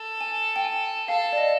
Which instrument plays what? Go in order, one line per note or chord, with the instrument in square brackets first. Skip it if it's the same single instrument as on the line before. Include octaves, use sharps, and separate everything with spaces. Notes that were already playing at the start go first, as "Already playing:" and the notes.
Already playing: [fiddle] A4
[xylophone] G#5
G5
G#5
[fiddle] A4 [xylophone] F5
[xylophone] D5
D#5